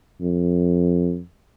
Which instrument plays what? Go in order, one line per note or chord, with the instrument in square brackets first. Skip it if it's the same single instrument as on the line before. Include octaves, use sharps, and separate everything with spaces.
[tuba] F2